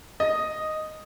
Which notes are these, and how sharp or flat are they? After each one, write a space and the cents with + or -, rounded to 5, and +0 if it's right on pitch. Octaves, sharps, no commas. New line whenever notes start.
D#5 -5